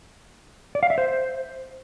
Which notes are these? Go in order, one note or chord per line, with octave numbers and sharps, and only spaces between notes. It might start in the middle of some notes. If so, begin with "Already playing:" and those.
D5
F5
E5
C5